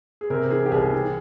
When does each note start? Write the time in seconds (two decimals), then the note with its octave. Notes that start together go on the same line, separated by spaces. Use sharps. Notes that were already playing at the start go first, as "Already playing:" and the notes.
0.21 G#4
0.30 C3 A#4
0.51 E3 G#4
0.66 G4
0.72 C2 G#4
0.93 E3